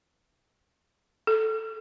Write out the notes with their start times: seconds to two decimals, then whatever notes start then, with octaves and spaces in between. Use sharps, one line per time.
1.27 A4